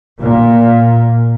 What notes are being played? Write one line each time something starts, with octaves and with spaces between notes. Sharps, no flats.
A#2